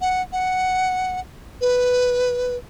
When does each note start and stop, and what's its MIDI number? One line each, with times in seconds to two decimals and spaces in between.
0.01 0.22 78
0.33 1.20 78
1.61 2.56 71